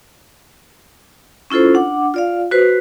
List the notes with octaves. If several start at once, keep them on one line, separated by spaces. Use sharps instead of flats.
C#4 E4 F4 A4 C5
D4 F#5 D6
F4 D5 F5
F#4 B4 C5